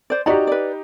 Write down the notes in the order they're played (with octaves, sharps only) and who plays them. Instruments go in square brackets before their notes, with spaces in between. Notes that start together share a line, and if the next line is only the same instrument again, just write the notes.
[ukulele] C5 D5
[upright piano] D#4 G4 [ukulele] F#4 D5 A#5
[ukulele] B4 D5